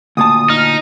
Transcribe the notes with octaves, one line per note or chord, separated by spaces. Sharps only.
D2 A#2 A5 D#6
D#4 F6